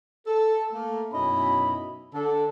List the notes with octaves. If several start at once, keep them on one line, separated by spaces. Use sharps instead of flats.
A4
A3 A#3
F#2 B2 C#4 D#4 E4 B5
D3 D4 A4